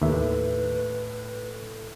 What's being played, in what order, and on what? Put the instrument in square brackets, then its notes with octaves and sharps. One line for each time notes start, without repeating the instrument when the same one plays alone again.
[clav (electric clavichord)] D#2 E5 [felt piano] A2 [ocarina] B4